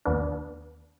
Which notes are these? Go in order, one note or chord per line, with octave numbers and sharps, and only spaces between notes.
D#2 B3 D4